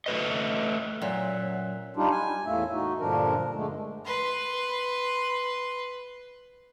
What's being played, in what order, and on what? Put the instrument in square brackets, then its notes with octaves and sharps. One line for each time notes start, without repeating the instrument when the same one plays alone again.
[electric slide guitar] A3 B4 D#5
[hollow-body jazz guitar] F#2 [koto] A#2 [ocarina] C#5 [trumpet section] E5 F#5
[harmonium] G3 D4 D#4 F4 G4
G#5
E2 A2 A3 A#3 E5
D#4 F#4
G2 A#2 D3 F3 D4 A#4
D3 G#3 A3
[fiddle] B4 C6